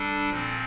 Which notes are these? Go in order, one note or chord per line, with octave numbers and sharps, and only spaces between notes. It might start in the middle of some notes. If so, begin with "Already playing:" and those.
Already playing: G3 D4 A4
A#2 F3 C4